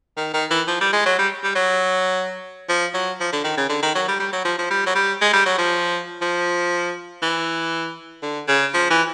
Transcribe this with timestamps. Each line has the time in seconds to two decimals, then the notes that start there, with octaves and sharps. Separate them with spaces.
0.17 D#3
0.34 D#3
0.50 E3
0.68 F3
0.81 G3
0.93 G#3
1.06 F#3
1.19 G3
1.44 G3
1.55 F#3
2.69 F3
2.94 F#3
3.20 F3
3.33 D3
3.44 D#3
3.57 C#3
3.70 D3
3.82 D#3
3.95 F#3
4.08 G3
4.20 G3
4.33 F#3
4.45 F3
4.59 F3
4.71 G3
4.87 F#3
4.95 G3
5.22 G#3
5.33 G3
5.46 F#3
5.58 F3
6.22 F3
7.22 E3
8.23 D3
8.48 C#3
8.74 F3
8.91 E3